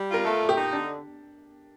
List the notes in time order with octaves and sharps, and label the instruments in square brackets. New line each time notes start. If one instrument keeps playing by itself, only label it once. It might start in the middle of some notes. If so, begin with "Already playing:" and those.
Already playing: [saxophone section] G3
F4
[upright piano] A#4
[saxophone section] A3 [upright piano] A4
[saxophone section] A#2
[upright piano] G4
[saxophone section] D#4
[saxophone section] D3 [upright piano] D4